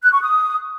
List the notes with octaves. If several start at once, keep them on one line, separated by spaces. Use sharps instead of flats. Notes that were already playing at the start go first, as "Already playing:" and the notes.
F#6
C#6
D#6